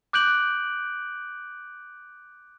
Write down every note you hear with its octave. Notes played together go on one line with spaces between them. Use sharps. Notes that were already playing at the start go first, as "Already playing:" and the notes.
D6 F#6 G6 D7 F#7